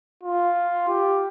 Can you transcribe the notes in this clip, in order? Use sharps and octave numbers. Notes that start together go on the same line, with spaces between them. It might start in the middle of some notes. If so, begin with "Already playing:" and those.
F4
G4